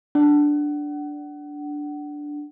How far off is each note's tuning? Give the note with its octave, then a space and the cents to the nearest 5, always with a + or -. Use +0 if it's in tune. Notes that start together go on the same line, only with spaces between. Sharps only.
D4 +0 F#5 +30